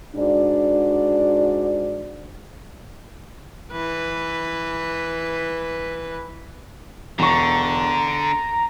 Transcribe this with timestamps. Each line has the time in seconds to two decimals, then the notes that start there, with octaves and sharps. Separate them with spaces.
0.15 G#2 D4 F#4 D5
3.72 E3 B4
7.19 E1 D3 A#5 C#6
8.07 D7